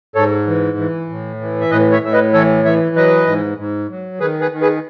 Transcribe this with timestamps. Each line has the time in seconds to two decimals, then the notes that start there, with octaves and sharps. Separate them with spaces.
0.15 G#2 A4 C#5
0.47 E3
0.78 E3
1.09 A2
1.41 E3
1.61 E5
1.71 A2 B4 D#5
1.92 C#5 E5
2.02 A2 E5
2.13 B4 D#5
2.33 E3 A4 C#5
2.65 E3 C#5 E5
2.96 F#3 B4 D#5
3.27 G#2
3.58 G#2
3.90 F#3
4.20 D#3 G#4 B4
4.41 G#4 B4
4.52 D#3
4.61 G#4 B4